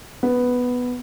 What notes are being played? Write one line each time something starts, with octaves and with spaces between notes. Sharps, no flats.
B3